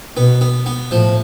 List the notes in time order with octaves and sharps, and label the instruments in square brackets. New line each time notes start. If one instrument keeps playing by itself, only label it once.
[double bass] B2 [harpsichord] B3
[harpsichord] B3
B3
[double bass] A2 [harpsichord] F3